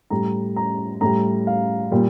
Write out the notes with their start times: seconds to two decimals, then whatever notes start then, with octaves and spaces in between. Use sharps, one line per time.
0.10 A2 G3 A#5
0.56 A#5
1.01 A2 G3 A#5
1.47 F5
1.91 A#2 G3